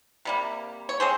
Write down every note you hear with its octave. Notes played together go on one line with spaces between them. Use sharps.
C3 G3 A#3
C#5
G#3 C4 G#4 C5